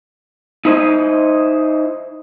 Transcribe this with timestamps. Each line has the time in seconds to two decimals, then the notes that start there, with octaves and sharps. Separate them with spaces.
0.65 D#4 E4 C5 D#5